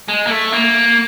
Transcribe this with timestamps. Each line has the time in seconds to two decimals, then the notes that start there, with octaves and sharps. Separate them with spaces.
0.08 G#3
0.27 A#3
0.30 A3
0.52 A#3